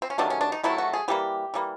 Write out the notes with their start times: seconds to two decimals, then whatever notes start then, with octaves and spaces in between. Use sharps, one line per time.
0.02 C4
0.10 C#4
0.18 C3 D#3 F#3 A3 D4
0.30 C#4
0.41 D4
0.52 D#4
0.63 C3 D#3 F#3 A3 E4
0.78 F#4
0.93 G#4
1.08 E3 G3 A#3 G4
1.54 E3 G3 A#3